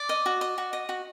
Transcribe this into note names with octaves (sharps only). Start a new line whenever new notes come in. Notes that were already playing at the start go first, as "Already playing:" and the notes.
Already playing: D5 D6
D#5
F#4
D#5
F#4
D#5
F#4